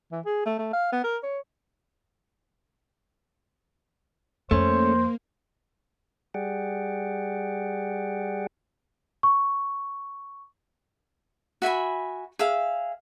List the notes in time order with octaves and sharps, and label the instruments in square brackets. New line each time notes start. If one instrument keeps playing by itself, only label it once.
[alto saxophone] E3
G#4
A3
A3
F5
B3
A#4
C#5
[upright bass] F2 [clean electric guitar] A3 C#4 [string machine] A#3 [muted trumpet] C5
[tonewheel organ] G3 G#4 D5 F#5 G5
[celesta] C#6
[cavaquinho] F#4 E5 G#5 B5
G#4 E5 F5